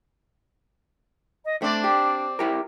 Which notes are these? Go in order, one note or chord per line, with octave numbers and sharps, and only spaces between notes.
D#5
A3 C4 D4 D5
G4
E4 G4 A#4